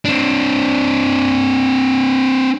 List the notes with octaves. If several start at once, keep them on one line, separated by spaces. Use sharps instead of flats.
C4 D4